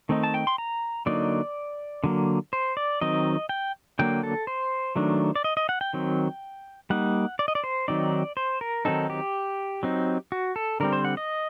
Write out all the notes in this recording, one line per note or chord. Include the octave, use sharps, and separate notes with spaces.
D#3 A3 C4 D#4
A5
G5
C6
A#5
D3 F#3 A#3 D#4 D5
D3 F#3 A#3
C5
D5
D#3 F#3 C4 D#4 D#5
G5
D3 F#3 A#3 G5
A4
C5
D#3 F#3 A3 D4
D5
D#5
D#5
F#5
G5
D#3 F#3 C4
G3 A#3 D#4 F#5
D5
D#5
D5
C5
D#3 F#3 C4 D#4 D5
C5
A#4
D#3 F#3 C4 D#4 A4
G4
F#3 C4 D#4
F#4
A4
D3 G3 C4 A#4
C5
F#5
D#5